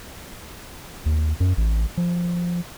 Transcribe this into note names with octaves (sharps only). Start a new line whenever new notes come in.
D#2
F#2
A1
F3